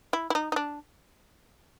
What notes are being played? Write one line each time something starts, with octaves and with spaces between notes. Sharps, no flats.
E4
E4
D#4
D#4
D4